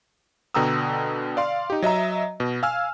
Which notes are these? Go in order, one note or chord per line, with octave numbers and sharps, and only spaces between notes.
B2 D3 G5 A#5 D#6 E6
D5 F5 C6
D#4 G4
F#3 D#5 E5 A#5
B2
F5 G#5 E6 F6